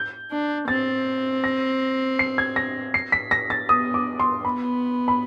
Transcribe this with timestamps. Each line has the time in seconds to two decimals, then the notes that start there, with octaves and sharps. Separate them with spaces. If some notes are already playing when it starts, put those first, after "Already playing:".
Already playing: G6
0.31 D4
0.68 C4 A6
1.44 A#6
2.19 C7
2.38 G#6
2.56 A#6
2.94 C7
3.12 B6
3.31 A#6
3.50 A6
3.69 B3 D#6
3.94 D6
4.20 C6
4.45 B3 B5
5.08 B5